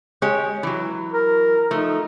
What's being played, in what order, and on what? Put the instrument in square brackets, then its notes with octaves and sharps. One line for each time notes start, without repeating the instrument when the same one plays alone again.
[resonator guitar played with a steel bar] G#3 G4 C#5
E3 F#3
[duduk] A#4
[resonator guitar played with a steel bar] F3 A3 [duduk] D#4